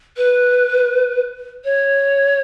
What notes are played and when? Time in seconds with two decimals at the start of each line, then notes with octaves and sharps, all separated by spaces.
0.16 B4
1.64 C#5